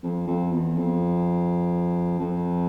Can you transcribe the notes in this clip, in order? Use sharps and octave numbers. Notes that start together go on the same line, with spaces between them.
F2
F2
E2
F2
F2